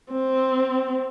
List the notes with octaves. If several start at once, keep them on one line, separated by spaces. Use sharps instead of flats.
C4